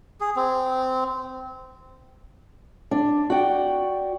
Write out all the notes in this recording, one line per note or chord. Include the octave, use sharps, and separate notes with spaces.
G#4
C4
D4
F#4 D5 G5